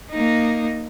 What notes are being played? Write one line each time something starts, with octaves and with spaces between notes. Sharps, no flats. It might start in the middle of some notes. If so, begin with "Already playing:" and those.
A#3 D#4